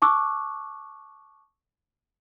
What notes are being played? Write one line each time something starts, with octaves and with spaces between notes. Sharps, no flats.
A5 C#6 D6 E6 F#6